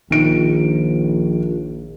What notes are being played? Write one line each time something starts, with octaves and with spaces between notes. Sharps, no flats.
A#1 D#3 D7